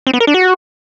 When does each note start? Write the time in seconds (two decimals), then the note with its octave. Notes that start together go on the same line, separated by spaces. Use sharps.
0.07 C4
0.13 B3
0.20 A#4
0.27 D4
0.34 F#4